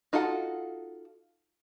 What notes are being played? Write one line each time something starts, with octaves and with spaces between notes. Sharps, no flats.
D#4 F4 F#4 A4 F#5